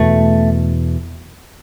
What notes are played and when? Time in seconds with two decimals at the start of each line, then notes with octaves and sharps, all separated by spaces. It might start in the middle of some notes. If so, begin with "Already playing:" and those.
Already playing: E2 B2 A3